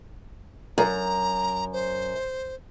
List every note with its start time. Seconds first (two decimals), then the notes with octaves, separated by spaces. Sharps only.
0.78 F#2 A#5
1.73 C5